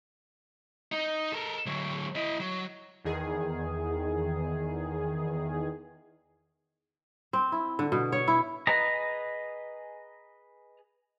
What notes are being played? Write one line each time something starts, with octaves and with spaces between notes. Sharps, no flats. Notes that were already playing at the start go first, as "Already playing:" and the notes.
D#4
A4 A#4
D3 F#3
E4 D#5
F#3
E2 D#3 G#4
C4
E4
D3
B2
C#5
E4
G#4 B4 D#5 A#5